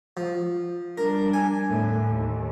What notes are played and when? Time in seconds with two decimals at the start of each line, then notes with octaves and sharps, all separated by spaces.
0.17 F3
0.98 G3 D4 A#4
1.34 G#5
1.65 E2 A2 D3
2.03 D#2